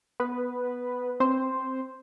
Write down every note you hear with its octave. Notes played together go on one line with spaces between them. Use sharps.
B3 B4
C4 C5